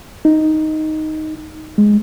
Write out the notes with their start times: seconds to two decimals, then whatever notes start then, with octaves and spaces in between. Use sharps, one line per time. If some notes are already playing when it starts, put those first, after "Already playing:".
0.25 D#4
1.78 G#3